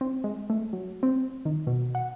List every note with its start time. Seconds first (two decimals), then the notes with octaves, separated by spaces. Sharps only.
0.01 C4
0.24 G#3
0.50 A3
0.73 F#3
1.03 C4
1.45 D#3
1.67 B2
1.95 F#5